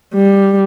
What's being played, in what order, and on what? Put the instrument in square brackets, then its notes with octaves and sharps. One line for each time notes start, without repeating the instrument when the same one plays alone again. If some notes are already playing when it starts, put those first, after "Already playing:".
[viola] G3